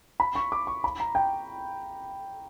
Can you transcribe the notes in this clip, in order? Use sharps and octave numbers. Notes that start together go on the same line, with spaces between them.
B5
C#6
D6
C#6
B5
A#5
G5